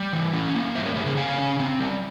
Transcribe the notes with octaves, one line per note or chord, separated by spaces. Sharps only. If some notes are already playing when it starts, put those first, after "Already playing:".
Already playing: G3
E3
C#4
A#3
G3 C5 E5
A#4 C#5
C#3 G4 A#4
G#4 C5
C#3 F5 G#5
C#4
C4
G3